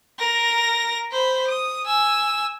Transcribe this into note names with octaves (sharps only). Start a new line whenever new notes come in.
A#4 A#6
C5 B5
D#6
G#5 E6